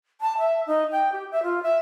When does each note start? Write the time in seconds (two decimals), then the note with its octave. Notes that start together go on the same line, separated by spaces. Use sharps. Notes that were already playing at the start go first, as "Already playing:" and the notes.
0.21 A5
0.38 E5
0.67 D#4
0.92 G5
1.12 G4
1.31 E5
1.43 F4
1.63 E5